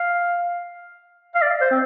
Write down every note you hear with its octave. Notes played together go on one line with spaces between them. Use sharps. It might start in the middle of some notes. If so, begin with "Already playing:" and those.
Already playing: F5
F5
D5
C5
C4